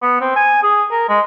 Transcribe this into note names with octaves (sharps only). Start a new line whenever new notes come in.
B3
C4
G#5
G#4
A#4
G#3